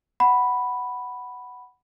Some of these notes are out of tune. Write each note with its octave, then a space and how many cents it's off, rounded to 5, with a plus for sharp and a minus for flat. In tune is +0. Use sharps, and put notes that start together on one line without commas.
F#5 +10 B5 +0